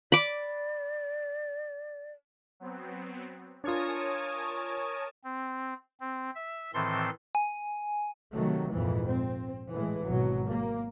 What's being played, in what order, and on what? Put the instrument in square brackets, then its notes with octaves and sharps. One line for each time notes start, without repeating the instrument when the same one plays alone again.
[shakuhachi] D5 [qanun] B5 D6
[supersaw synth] F#3 B3 C4
[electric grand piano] D4 F4 [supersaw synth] A#4 G#5 A5 [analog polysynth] C#5 D#6
[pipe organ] C4
C4
E5
A2 D#3 E3 C4 A4 C6
[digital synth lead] G#5
[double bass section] C3 D#3 F#3 A3
A#1 F2 G#2 E3
C4
A2 E3 G#3
G#1 B2 F#3
A#3